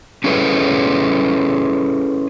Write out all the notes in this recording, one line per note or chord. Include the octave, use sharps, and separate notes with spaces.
C#4 E4 G#4 A4 B4 C#5